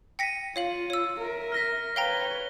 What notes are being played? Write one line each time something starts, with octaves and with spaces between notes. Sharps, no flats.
G5 A#6 B6 C#7 D#7
F4 C#5 F5 F#7
C#5 E6
A#4 E5
F6 A#6 B6
B4 C#5 F5 G5 A#5 G7